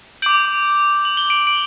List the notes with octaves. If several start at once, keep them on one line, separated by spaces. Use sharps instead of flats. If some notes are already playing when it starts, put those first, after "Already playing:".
D6 G6 D7 F#7
F#7
G7
D7 F#7
D7 F#7